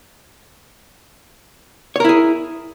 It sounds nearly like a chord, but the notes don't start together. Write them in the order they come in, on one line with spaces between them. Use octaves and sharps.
C#5 A#4 E4 G#4